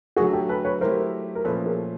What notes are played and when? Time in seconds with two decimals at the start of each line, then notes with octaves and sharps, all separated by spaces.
0.16 D3 F#3 A3 F#4 G#4
0.33 G4 A4
0.49 A4 B4
0.65 B4 C#5
0.81 F#3 A3 C4 E4 G4 A#4 C5
1.35 A#4
1.45 A#2 F3 A3 C#4 A4 B4
1.66 G#4 A#4